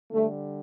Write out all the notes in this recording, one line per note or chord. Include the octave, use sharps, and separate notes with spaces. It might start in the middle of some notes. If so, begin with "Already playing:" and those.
D3 G3 A3